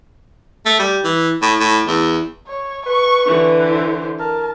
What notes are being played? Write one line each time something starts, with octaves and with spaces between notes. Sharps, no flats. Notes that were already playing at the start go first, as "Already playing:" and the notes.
A3
G3
E3
A2
A2
E2
C#5
B4 C#6
D3 E3
C5
A#4 A5